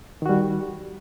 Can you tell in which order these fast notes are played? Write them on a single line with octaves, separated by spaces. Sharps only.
D#3 F#4 G3